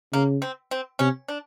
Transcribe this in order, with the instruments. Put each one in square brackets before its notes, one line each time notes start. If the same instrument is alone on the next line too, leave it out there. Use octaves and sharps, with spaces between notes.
[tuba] C#3 [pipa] A#3
[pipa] C4
C4
[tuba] C3 [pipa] C#4
[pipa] D4